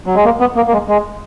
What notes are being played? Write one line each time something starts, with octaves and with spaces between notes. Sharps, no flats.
F#3
G#3
A#3
B3
A#3
A#3
G#3
G#3